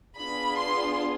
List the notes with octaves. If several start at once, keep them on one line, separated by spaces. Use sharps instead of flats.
B3 D4 F4 G#4 B5
C6